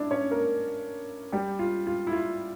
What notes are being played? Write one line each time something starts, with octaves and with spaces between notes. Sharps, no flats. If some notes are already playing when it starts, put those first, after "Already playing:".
Already playing: D4 E4 D5
C#4 C#5
A#3 A#4
G3 G4
F4
F4
E4
F4